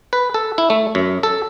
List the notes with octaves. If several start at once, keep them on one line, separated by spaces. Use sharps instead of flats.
B4
A4
E4
A3
F#2
A4